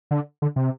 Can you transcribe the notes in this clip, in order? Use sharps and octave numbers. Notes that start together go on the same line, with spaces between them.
D3
D3
C3